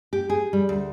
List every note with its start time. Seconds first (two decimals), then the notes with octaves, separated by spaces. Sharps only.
0.13 G4
0.30 G#4
0.53 G3
0.69 D2